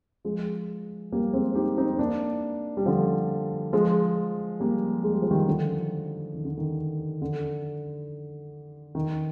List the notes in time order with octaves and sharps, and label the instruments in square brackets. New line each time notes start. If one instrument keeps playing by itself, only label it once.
[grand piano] F3 G#3
G3 A#3
G#3 C4
D#4 G4
C4 D#4
A#3 D4
G3
D3 F3
F3 G#3
G3 A#3
G#3
G3
F3
D#3 G3
D3 F3
D#3
D3
D#3
D3
D#3